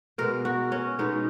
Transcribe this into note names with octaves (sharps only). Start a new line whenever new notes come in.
B2 G#3 B3 A#4
F#4
C#4
B2 G#3 B3 D#4